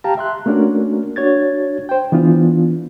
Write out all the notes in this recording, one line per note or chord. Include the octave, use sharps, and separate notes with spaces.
G4 F5 G5 A5 A#5
E5 C6 F#6
A3 A#3 C#4 D4 F#4 A#4
D4 F#4 C#5 G#6 A6
C5 G5
E3 B3 D4 F4